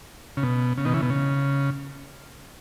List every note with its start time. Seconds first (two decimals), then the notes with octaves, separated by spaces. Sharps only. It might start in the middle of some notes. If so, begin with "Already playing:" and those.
0.37 C#3
0.43 B2
0.77 C#3
0.85 B2 D#3
0.94 C#3 E3
1.02 B2
1.10 C#3